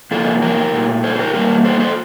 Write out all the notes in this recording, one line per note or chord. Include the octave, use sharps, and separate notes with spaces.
C3 F3 A#3 F4 A4
G4 A#4
A#2 A3
A4 C5
C5
G4 A#4
A2 G3 A#3 G4 A#4
A4 C5
A4 C5